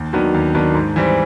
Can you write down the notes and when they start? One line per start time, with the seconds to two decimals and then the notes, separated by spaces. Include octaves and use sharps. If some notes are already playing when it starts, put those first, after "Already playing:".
Already playing: D#2
0.13 D#3 F#3 B3 D4
0.34 D#2
0.55 D#3 F#3 B3 D4
0.74 G#2
0.96 E3 G3 C4